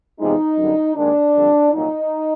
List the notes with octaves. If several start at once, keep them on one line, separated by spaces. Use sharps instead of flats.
E2 C3 F3 G#3 D#4
F#2 D3 G3
D#2 D#3 G#3 D4
F2 D3 G3
C2 A#2 F#3 D#4